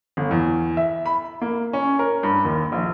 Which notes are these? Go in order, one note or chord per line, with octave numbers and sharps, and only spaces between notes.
G1
E2
E5
B5
A#3
C#4
A#4
G2
D#2
A#1